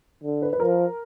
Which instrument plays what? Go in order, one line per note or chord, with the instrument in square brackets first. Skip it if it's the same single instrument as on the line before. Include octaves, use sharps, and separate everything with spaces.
[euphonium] D3
[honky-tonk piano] B4
B4
[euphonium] F3 [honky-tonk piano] A#4